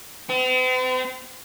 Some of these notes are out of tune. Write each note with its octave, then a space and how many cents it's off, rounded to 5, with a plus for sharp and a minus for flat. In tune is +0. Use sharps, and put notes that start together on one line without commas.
C4 -45